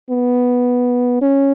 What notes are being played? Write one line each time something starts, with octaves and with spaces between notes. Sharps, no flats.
B3
C#4